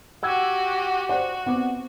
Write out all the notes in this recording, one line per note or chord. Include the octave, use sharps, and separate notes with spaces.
F#4 G4 F#5 E6 G#6
F#4 C5 D5 F#5
B3 C4 D6